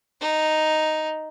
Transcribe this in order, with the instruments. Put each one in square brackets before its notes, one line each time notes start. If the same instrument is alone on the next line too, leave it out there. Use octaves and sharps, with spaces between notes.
[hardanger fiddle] D#4